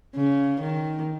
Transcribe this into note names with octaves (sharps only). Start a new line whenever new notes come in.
C#3
D#3